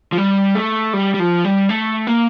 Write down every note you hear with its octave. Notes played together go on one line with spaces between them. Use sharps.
F3
G3
A3
G3
G3
F3
G3
A3
A#3